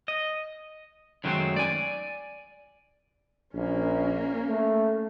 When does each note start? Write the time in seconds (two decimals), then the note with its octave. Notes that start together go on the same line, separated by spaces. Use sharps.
0.08 D#5
1.24 F#2 D#3 F#3 G#3 A3 C4
1.56 D5 G#5
3.55 A#1 A#3 C#4
4.48 A3